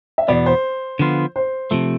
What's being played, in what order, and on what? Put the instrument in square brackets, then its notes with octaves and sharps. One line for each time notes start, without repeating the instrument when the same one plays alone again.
[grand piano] E5
[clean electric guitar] E2 B2 B3 [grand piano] D5
[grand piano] C5
[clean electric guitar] D3 F3 B3 F4
[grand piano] C5
[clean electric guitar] C3 F3 A3